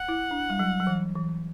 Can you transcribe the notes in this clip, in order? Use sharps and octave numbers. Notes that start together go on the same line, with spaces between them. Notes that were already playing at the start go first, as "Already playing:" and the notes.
Already playing: F#5
E4
D4
G3
F#3
F#3
E3
E3